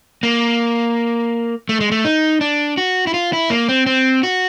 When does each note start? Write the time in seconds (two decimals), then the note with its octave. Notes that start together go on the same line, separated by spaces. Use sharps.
0.23 A#3
1.69 A3
1.81 G#3
1.92 A3
2.05 D#4
2.41 D4
2.78 F#4
3.07 E4
3.14 F4
3.33 E4
3.50 A#3
3.69 C4
3.86 C4
4.23 F#4